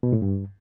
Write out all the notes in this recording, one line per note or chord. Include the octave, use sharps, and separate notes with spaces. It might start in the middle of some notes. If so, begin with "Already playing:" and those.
B2
A2
G2